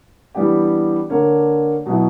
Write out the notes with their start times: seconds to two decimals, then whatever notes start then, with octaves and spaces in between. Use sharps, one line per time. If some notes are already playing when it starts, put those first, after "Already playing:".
0.35 E3 G3 B3 D4 G4
1.10 D3 A#3 D4 A#4 C#5
1.86 B2 F#3 B3 E4